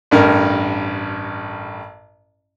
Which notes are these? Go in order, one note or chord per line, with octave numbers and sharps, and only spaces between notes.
A1 G2 A#4